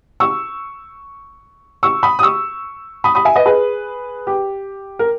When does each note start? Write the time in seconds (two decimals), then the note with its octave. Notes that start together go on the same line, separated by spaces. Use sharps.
0.20 C#6 E6
1.83 C#6 E6
2.03 B5 D#6
2.19 D#6
2.23 C#6 E6
3.04 B5 D#6
3.15 B5 D#6
3.25 E5 G#5
3.35 B4 D#5
3.46 G#4 B4
4.27 G4
4.99 A#4